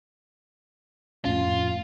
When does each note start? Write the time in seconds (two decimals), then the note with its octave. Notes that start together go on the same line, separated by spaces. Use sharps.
1.25 F2 A2 C#4 F4